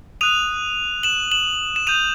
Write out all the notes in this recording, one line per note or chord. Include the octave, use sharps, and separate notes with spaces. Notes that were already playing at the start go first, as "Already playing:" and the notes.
D#6 F#6 D#7 F7
E7 F#7
E7 F#7
E7
D#6 G6 D#7 F7